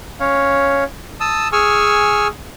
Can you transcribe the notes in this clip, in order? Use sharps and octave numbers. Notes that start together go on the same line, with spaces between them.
C#4 C#5 F5
A5 D#6 E6
G#4 G#5 C#6 E6 F6